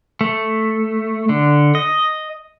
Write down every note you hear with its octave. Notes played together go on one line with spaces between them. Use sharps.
A3
D3
D#5